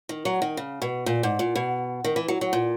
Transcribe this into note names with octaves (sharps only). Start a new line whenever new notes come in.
D#3
F#3
D#3
C#3
B2
A#2
G#2
A#2
B2
D#3
E3
F#3
F#3
A#2